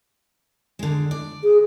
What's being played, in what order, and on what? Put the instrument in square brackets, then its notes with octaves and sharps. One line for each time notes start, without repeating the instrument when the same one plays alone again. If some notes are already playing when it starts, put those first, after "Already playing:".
[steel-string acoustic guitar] D3 G#3
D5
[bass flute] G#4